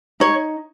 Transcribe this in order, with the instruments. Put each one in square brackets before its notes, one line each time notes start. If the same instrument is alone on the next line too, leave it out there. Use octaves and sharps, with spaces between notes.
[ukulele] D#4 C#5